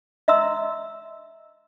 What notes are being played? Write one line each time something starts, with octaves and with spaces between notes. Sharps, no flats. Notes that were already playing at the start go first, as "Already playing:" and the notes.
D#5 E5 A#5 C6 E6